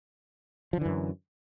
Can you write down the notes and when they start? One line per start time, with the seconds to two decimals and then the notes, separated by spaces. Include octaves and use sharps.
0.73 F3
0.77 D3
0.81 E3
0.86 F#2